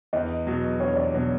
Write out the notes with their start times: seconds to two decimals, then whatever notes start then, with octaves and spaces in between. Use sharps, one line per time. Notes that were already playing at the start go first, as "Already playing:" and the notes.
0.13 E2 D#5
0.47 B2 F#3
0.80 E2 C#5
0.97 D5
1.14 B2 F#3 C#5